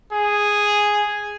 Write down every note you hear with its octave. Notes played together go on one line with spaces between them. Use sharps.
G#4